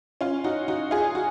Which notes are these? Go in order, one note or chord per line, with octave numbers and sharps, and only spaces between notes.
C#4 F4
D#4 F#4
D#4 F#4
F4 G#4
F#4